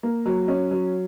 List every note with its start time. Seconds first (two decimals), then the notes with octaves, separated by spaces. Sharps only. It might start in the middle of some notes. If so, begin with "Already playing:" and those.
0.03 A#3
0.26 F#3
0.48 C#4
0.71 F#3